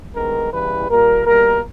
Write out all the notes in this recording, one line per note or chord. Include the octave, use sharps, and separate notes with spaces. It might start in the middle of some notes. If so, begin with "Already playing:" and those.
G2 D#3 G#3 B3 A#4
E2 C#3 E3 G3 B4
A#2 G3 A#3 A#4
B2 G3 A#3 A#4